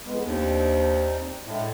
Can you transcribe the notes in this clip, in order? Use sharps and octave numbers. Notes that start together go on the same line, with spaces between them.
F2 G#3 B3
D#2 C4 D4 D#4
A2 D3 G#3 E4